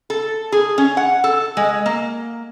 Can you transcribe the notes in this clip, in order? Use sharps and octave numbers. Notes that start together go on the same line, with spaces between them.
A4
G#4
C#4
F#5
A4
G#3
A#3